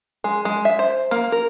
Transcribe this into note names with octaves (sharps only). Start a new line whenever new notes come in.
G#3
G#3
E5
C5
A#3
A#4